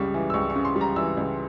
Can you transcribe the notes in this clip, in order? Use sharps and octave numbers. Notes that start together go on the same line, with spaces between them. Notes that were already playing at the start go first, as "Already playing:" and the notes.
Already playing: C#2 C#3 G3 C#6
E3
E6
C#2 C#6
C#6
C#3
C6
G3
A#5
E3 E6
C#2